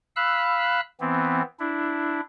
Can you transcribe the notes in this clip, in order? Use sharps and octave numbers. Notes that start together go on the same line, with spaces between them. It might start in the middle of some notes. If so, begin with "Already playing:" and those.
F5 B5 E6 F#6
E3 B3 C4
D4 E4